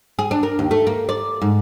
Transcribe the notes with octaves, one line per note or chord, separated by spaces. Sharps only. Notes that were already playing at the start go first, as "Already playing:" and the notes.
G#4
D4
A#4
D#2
A3
A#3
D5
G#2